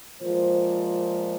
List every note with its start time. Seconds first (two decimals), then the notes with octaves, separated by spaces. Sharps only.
0.22 A#2 F3 G#3 C5